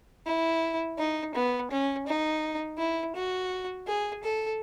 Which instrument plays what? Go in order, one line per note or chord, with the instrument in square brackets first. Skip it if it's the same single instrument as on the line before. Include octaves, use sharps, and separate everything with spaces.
[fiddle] E4
D#4
B3
C#4
D#4
E4
F#4
G#4
A4